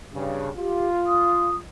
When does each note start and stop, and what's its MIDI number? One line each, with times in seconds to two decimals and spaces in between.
0.14 0.50 43
0.14 0.50 49
0.57 1.59 65
0.57 0.87 67
1.07 1.56 87